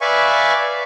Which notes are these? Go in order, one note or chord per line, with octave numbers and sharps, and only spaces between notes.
B4 D5 E5 F5 G#5 C#6